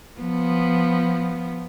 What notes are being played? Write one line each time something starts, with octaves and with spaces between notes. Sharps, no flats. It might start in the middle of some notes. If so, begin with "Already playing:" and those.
F3 B3